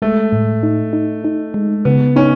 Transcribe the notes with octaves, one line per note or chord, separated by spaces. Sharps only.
G#3 A3
A2
D#4
D#4
D#4
G#3
C#3 B3
C#4 D#4